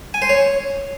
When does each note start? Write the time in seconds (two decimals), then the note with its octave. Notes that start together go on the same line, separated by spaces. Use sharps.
0.14 G#5
0.22 C5
0.29 C#5